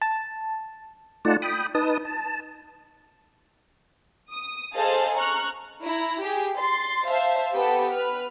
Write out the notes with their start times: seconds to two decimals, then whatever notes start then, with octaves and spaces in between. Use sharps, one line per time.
0.02 A5
1.25 A3 D#4 F4 D5 F#5 A5
1.42 G5 B5 D#6
1.75 D#4 B4 A5 D#6
2.05 A5
4.31 D#6
4.75 G#4 A4 C5 D#5 F5 A5
5.15 A#5 C#6 F6 F#6
5.84 E4 A#5
6.22 G4 G#4
6.58 C6 A6
7.07 C5 E5 F5 A5
7.54 B3 G4 A4 A5
7.93 B4 F6